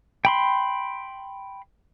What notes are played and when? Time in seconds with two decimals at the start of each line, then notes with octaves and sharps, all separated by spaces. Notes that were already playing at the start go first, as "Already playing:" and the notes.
0.25 G5 B5 C6